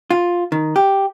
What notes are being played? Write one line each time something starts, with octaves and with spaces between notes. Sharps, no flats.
F4
D#3
G4